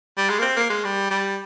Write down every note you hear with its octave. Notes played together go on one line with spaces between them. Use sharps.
G3
G#3
A#3
C4
A#3
G#3
G3
G3